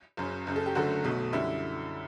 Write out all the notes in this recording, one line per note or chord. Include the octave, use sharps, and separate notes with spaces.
F#1 F#2 C#3
F#1 F#2 C#3
A4
G4
F#1 F#2 D3 A3 F#4
B1 B2 F#3 A3
F#2 D3 G3 E4